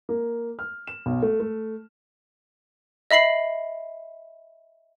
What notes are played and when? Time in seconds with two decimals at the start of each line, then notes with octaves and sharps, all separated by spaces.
0.09 A#3
0.59 F6
0.87 E7
1.06 B1
1.22 A3
1.40 A3
3.11 D#5 E5 B5 C7 F#7